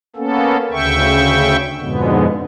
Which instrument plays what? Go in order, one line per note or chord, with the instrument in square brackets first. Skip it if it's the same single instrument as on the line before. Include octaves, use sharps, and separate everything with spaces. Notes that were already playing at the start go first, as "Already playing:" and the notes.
[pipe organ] A#3 B3 C#4 A4
D2 C#3 E5 G5 C#6
F2 G#2 B2 D3 G#3 B3